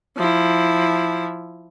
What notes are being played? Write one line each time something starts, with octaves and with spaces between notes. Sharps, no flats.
F3 E4